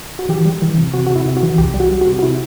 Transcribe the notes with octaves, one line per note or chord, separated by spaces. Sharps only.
F#4
E3 G4
G3
E3
C3
C3 F#4
C3 F#4
E4
C3
F#4
E3
C2 G4
G3
F#4
G3
F#4
C3
F#4
C3 E4